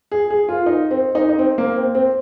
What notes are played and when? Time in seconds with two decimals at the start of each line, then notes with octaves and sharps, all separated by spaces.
0.12 G#4
0.30 G#4
0.49 F4
0.66 D#4
0.91 C4
1.15 D#4
1.29 D#4
1.39 C4
1.58 A#3
1.76 C4
1.95 C4